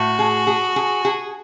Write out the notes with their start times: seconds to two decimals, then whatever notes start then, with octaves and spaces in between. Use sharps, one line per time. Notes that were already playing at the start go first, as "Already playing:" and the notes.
Already playing: A2 F#4
0.19 G#4
0.47 G#4
0.76 G#4
1.05 G#4